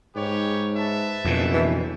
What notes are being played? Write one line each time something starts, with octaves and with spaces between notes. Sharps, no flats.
G#2 G4 B4 C#5
B4 E5 A5
F#1 F2 B2
E3